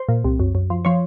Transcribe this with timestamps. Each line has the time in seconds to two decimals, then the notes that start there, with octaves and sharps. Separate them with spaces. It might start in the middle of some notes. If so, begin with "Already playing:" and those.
Already playing: C5
0.09 A#2
0.24 C2
0.40 F#2
0.55 F#2
0.70 F3
0.85 F3 C#5